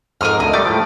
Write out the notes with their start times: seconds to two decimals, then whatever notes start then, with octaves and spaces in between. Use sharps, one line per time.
0.21 F2 G#2 A#4 D#6 F6
0.40 D2 D#5
0.53 G3 A3 D5
0.66 A2 F3